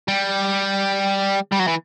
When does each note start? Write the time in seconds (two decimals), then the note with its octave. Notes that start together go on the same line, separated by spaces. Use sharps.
0.08 G3
1.52 G3
1.60 F#3
1.68 E3